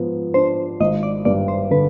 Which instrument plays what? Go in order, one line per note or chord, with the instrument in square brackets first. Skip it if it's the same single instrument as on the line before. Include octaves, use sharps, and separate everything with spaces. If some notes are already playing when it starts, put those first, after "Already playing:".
Already playing: [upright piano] G#2 F3 B3
[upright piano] D4 [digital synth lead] C5
[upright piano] G#1 [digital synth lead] D#5
[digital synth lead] D5
[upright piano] G2 [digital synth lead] D5
[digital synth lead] C5
[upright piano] D3 [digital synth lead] B4